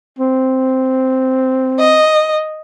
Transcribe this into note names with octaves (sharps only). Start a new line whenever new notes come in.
C4
D#5